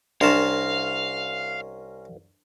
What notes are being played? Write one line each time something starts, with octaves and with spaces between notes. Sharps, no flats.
C2 C#4 D4 A#4 F5 A5 C6